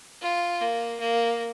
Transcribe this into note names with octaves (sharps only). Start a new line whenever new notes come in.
F4
A#3
A#3